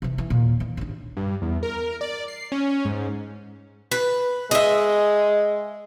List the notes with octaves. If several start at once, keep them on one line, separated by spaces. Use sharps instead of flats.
C3 E3
E3
D#2 A#2
E3
A1 D4
G2
E2
A#4
D5
C7
C#4
G#2
B4
G#3 D#5 E5